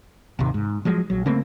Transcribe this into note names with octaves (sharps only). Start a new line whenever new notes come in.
G#1 D#2 C3 D#3
G#2
F3 F#3 G#3
A#1 F#3
C#3 A3 A#3 C4